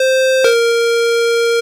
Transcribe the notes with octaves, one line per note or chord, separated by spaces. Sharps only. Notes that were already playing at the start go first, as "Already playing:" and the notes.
Already playing: C5
A#4